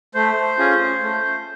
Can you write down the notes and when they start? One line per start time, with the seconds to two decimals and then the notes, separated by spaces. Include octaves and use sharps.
0.15 A3 C5
0.58 C#4 F4 G#4
1.02 A3